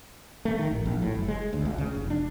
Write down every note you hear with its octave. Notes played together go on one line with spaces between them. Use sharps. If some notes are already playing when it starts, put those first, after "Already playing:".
A3
D#3
A1
A#1
A2
F#1
G#3
D2
C#2
C#3
F1
D4